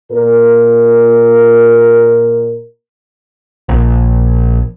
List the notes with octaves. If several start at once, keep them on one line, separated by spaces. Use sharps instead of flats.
A#2 A#4
A#1